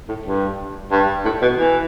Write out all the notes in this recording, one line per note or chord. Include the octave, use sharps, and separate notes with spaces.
A2
G2
G2
A2
B2
E3